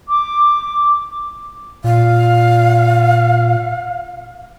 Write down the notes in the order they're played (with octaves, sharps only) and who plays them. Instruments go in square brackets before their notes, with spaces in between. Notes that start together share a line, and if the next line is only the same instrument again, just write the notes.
[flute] D6
[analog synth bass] A#2 [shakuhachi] F5